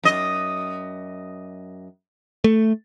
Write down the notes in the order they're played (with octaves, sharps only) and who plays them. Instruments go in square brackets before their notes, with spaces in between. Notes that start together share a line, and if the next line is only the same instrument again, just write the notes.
[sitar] F#2 D#5
[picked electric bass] A3